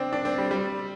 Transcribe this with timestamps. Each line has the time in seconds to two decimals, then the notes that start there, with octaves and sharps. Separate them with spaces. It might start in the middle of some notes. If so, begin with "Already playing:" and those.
Already playing: C4 D4
0.13 D4
0.25 C4
0.38 G3
0.51 G3